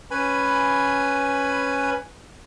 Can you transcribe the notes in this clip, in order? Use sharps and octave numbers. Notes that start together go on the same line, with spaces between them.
C#4 B4 G#5 B5